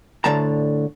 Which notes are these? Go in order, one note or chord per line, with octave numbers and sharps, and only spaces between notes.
D2 A2 D3 G#3 A5 A#5